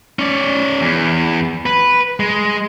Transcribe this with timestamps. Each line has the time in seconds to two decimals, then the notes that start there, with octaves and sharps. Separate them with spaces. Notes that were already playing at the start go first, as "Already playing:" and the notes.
0.19 C#4 D5
0.81 E2
1.66 B4
2.20 G#3